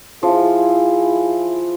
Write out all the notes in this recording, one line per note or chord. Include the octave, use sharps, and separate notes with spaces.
F3 E4 G#4